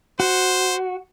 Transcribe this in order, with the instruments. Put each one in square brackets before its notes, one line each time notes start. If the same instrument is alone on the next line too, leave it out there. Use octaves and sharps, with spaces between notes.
[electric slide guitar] F#4 [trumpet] C5